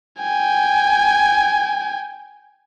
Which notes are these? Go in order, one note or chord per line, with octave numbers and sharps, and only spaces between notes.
G5 G#5